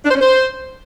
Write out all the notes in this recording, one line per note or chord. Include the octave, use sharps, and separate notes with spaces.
D4
C5
C#4
C5